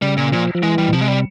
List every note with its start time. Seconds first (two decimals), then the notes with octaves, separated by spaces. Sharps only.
0.02 C#3 G3
0.17 A#2
0.32 A#2 F3
0.55 F3
0.63 E3 G#3
0.78 G3
0.88 A#2
0.93 C3 F3
1.01 G#3
1.08 G3